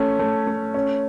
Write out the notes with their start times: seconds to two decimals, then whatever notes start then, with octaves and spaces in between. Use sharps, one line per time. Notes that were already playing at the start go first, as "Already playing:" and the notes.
Already playing: A3 C#4
0.19 A3
0.47 A3
0.74 C#4